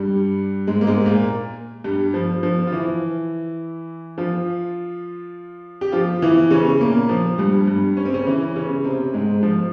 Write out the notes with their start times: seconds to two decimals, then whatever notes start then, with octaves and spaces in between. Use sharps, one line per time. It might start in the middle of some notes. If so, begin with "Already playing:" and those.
Already playing: G2 G3
0.67 G#2 G#3
0.81 A#3
0.87 G#2 G#3
1.06 A#2 A#3
1.84 G2 G3
2.14 F3
2.43 F3
2.67 F4
2.72 E3 E4
4.18 F3 F4
5.81 G4
5.92 F3 F4
6.22 E3 E4
6.51 C#3 C#4
6.80 A#2 A#3
7.09 F3
7.38 G2 G3
7.67 G2 G3
7.97 C#4
8.05 C4
8.14 C#3 C#4
8.27 E3 E4
8.56 C#3 C#4
8.84 C3 C4
9.14 G#2 G#3
9.43 F3